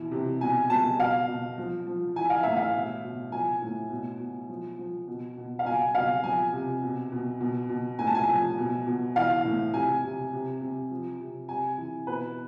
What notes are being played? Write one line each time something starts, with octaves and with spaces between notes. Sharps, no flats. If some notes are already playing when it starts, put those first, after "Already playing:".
Already playing: B2 E3
C3
B2 G#5
B2 A5
B2 F5
B2
F3
F3
E3 G#5
F5
A2 E5
F5
B2
B2
F3 G#5
A2
B2
B2
F3
F3
B2
B2
F5
B2 G#5
B2 F5
F3 G#5
C3
B2
B2
B2
B2
A2 G#5
A5
G#5
F3
B2
B2
E3 F5
A2
C3 G#5
C3
C3
C3
F3
C3
C3 G#5
E3
B2 B4